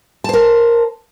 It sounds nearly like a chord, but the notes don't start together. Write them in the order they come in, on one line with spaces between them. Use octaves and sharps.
A5 C5 A#4